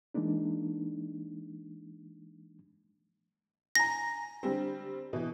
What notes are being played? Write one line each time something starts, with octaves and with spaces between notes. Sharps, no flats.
E3 G#3 A#3 D4 D#4
G#5 A#5 A#6
D3 G3 C4
B2 E3